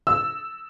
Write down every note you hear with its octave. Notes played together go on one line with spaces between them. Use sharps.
E6